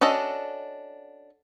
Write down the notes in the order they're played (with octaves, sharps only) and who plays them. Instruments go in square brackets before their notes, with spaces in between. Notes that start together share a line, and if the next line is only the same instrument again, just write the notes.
[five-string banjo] C#4 D4 F#4 A4 D#5